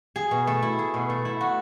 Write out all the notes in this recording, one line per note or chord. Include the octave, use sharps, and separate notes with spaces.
G#4
B2
A3
E4
G#4
B2
A3
E4
F#4